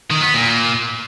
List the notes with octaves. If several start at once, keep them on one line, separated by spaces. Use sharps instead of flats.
D#3
B3
A#2